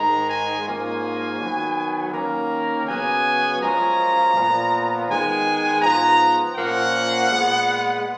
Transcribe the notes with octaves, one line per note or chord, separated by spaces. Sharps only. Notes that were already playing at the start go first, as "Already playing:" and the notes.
Already playing: G#2 D#3 G#3 A#5
G#5
G#2 F3 A#3 C#4 G#5
D#3 F#3 B3
D#3 A#3 C#4 A#5
C#3 F#3 B3 G#5
F#2 F3 G#3 C#4 A#5
A#2 F3 B3
D#3 G#3 B3 G#5
G#2 F3 B3 A#5
A#2 F3 A#3 C#4 F#5
A#2 G#3 B3